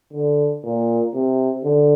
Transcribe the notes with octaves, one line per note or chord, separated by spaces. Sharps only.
D3
A#2
C3
D3